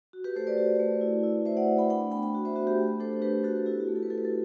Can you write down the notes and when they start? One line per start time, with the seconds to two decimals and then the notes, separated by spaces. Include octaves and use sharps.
0.13 F#4
0.24 G4 B4
0.36 A3 A4 C5
0.47 B4 D5
0.58 F#4
0.80 A3
1.01 E4
1.23 E4
1.46 A3 C5 E5
1.57 D5 F#5
1.69 A3
1.78 G5 B5
1.90 D4 G5 B5
2.12 B3 G5 B5
2.22 G5 B5
2.35 F#4
2.45 C5 E5
2.56 B3 F#4
2.67 G4
2.78 A3
3.00 D4 A4 C5
3.22 D4 G4 B4
3.44 F#4 A4
3.66 E4 G4
3.80 F#4
3.88 A3
3.96 A4
4.03 B4
4.10 E4 A4
4.18 B4
4.25 A4